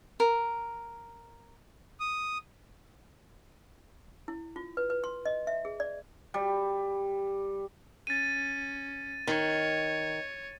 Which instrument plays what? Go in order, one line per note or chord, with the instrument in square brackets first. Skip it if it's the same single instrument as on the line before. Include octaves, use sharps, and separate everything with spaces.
[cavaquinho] A#4
[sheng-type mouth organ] D#6
[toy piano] E4
F4
B4
B4
C6
D#5
E5
G#4
D5
[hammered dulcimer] G3
[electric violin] C#4 [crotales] A6 D#7
[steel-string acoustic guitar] D#3 [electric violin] C#5